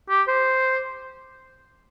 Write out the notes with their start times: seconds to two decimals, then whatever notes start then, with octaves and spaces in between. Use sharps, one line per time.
0.10 G4
0.28 C5